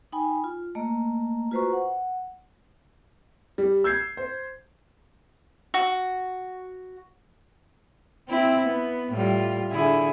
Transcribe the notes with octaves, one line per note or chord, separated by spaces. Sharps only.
D#4 G5 G#5 B5
F4
A3 A#3 D#5 A#5
F4 F#4 B4 C5 A#5 C#6
F#5
G3
E6 G6 G#6 C7
C5
F#4
C4 E4
B3
A2 G3 F4
D3 E4 G#4